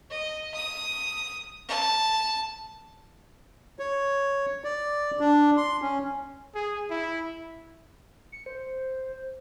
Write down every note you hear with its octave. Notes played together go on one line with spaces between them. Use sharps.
D#5
D#6
A5
C#5
D5
D4
C6
C#4
G#4
E4
C#7
C5